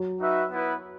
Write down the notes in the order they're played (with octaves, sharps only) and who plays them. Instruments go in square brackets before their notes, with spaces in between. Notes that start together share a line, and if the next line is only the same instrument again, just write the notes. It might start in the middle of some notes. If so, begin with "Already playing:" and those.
Already playing: [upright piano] F#3
[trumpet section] D#4 F#4 B4 E5
B3 E4 B4